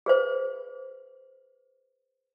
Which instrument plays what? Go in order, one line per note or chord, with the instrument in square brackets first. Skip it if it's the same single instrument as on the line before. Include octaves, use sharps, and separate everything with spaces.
[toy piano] G#4 B4 C5